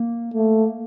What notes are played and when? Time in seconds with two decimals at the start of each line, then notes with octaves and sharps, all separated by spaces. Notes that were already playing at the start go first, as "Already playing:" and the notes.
Already playing: A#3
0.34 A3 A#3